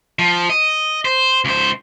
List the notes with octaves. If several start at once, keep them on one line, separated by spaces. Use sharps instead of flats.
F3
D#5
C5
C#2 C5